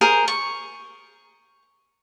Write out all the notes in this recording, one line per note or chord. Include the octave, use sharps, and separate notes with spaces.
G#4 A#4 C5
C#6